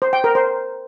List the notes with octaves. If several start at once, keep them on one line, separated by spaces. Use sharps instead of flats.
C5
G5
A#4
C5